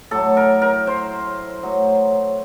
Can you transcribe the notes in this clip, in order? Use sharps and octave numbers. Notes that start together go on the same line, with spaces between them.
A2 F#3 A4
A#4
A#4
C5
A2 F#3